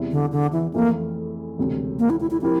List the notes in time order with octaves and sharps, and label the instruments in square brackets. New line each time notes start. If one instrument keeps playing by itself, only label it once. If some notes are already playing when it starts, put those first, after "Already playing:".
Already playing: [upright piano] E2 C3 G3 C4 E4
[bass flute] D3
D3
E3
[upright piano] F2 E3 A3 C4 E4 [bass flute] A#3
[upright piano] E1 D2 C3
[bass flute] A#3
E4
E4
E4
[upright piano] F3 C4 G4 A#4 [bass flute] E4